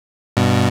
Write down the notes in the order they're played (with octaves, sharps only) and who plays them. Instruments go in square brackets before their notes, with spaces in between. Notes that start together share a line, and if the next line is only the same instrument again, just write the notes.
[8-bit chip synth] G2 B2